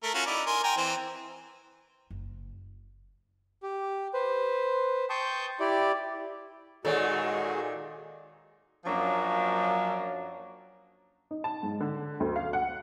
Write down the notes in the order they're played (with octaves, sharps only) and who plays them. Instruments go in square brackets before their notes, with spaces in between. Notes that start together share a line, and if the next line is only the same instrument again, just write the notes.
[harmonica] A3 A#4
C#4 F4 F#4
D#4 E4 D5
A#4 G#5 C6
G5 G#5 A#5
E3 C4 C5
[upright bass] F#1
[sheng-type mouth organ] G4
B4 C5
G5 A5 C6 C#6 D#6 G6
E4 G4 D5
[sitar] A#2 D#3 [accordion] G#3 F#4 G#4 [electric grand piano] A4 C#5 D5
[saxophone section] F#2 F3 F#3 A#3 D4
[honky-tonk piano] D#4
A5
G#2
D3
D2
F5
F#5